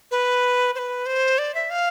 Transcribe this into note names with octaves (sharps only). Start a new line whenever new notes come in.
B4
C5
B4
C5
D5
E5
F5